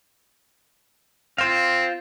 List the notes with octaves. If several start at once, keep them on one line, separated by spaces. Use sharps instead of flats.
C4 F4 C5 F5